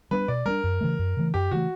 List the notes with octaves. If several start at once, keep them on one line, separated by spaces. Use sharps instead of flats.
G3 B3 D4 B4
B2 D5
G3 B3 D4 A#4
F#2
C#3 E3 A3
F#2
C#3 E3 A3
F#2 G4
C#3 E3 A3 F#4